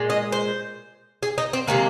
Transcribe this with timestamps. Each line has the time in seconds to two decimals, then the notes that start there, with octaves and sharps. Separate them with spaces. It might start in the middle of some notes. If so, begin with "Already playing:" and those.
Already playing: A#2 G#3
0.10 D#5
0.32 C5
1.23 G#4
1.38 D#4
1.53 C4
1.67 C3 D#3 G#3 A#3